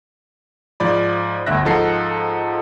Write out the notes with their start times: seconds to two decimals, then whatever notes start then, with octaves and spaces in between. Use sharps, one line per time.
0.80 G#2 F3 D5 B5
1.46 G1 D2 E5 F#6 A#6
1.65 G#2 F3 D#4 A4 F#5 C7